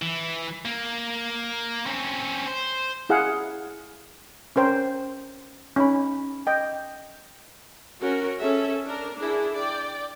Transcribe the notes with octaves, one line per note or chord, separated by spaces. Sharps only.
E3
A#3
C4 C#4
C5
E4 G#4 F5 F#5
C#4 A#4 C5 G5
C#4 D#4 B5
D#5 G5
C#4 F#4 A#4
C#4 G#4 A4 E5
D4 A#4
D4 E4 G#4
D5 G5